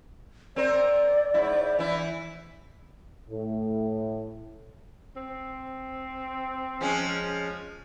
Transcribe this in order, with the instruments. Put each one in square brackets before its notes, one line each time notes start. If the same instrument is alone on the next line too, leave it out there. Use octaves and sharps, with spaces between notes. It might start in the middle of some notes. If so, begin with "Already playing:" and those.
[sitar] C4 A#4 [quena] D5
[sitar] G#2 E4
E3 E4
[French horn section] A2
[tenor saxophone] C4
[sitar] F3 G#3 C#4